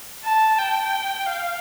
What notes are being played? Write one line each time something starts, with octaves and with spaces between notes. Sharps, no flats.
A5
G5
F5